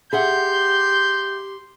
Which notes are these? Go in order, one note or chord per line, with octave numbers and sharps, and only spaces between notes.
G4 G#4 E5 F#5 C6 G6